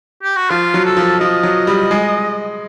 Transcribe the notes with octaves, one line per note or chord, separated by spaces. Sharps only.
G4
F#4
F3 F4
F#3
A4
F3
F3 D#5
F#3
G3
G#3